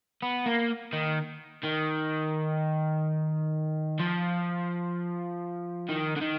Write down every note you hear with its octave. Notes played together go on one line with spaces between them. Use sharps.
B3
A#3
D#3
D#3
F3
D#3
D3
D#3